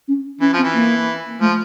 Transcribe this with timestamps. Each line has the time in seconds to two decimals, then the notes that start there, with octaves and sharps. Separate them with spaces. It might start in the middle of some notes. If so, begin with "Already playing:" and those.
0.08 C#4
0.41 E3 C#4
0.53 F3
0.58 C4
0.63 E3
0.75 A#3
1.41 F3 A3